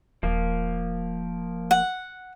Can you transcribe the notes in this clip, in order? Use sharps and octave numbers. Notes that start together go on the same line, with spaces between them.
D#1 F3 A#3
F#5